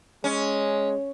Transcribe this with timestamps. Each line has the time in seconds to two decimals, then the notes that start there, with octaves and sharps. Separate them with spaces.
0.24 G#3 C#4